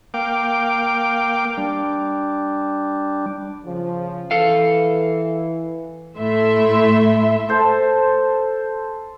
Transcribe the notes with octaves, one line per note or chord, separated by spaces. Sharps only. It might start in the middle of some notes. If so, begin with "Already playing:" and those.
A#3 F5 G5 D6
G3 D4
C#3 F3
E3 A4 F5
A2 A3 E4 E5 C6
A4 C5 A5